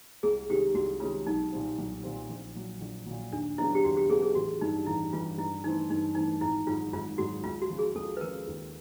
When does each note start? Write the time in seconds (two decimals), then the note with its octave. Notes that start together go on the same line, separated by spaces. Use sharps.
0.23 C2 G#4
0.50 C3 D#3 G#3 C#4 G4
0.75 C2 F#4
1.00 C3 D#3 G#3 C#4 F4
1.27 B1 D#4
1.52 A#2 G3 C4
1.78 B1
2.04 A#2 G3 C4
2.29 A#1
2.55 A#2 F#3
2.81 A#1
3.06 A#2 F#3
3.33 D#2 D4
3.58 C#3 F#3 B3 D4 E4
3.75 G4
3.84 D#2 F#4
3.97 G4
4.09 C#3 F#3 B3 D4 G#4
4.22 G#4
4.35 A1 F#4
4.61 G2 E3 D#4
4.87 A1 E4
5.13 G2 E3 F4
5.38 G2 E4
5.64 E3 A3 C4 D#4
5.90 G2 D#4
6.15 E3 A3 C4 D#4
6.41 G#1 E4
6.67 G#2 D#3 F#3 F4
6.93 G#1 F4
7.18 G#2 D#3 F#3 F#4
7.44 C#2 F4
7.62 F#4
7.70 C#3 F3
7.78 G#4
7.95 C#2 A4
8.17 B4
8.21 C#3 F3 A#4
8.47 D#2